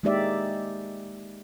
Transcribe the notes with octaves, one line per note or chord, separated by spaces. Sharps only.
G#3 A#3 D#4 G4 D5 E5